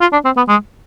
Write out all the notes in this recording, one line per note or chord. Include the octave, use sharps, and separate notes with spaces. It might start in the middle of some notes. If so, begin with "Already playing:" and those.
F4
D4
C4
B3
G#3